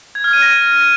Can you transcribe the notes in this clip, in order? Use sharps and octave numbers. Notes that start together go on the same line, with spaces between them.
G#6
F6
D#7
A#6